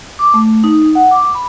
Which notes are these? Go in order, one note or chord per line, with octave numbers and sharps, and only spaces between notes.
D6
A3
D#4
F#5
D6
B5